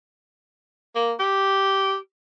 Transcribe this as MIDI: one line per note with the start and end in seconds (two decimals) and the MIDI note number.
0.95 1.13 58
1.19 1.95 67